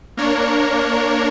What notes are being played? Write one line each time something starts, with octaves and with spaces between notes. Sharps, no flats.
A#3 D4 A#4 C#5